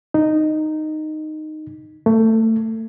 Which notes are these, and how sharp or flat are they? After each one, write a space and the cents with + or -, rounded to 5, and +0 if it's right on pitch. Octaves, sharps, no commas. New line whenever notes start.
D#4 -10
A3 +25